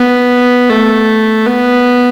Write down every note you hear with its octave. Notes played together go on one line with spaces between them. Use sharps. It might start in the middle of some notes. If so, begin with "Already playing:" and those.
Already playing: B3
A3
B3